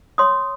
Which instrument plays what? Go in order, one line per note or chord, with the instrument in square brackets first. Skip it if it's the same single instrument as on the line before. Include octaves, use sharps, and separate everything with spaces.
[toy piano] C#5 C6 D#6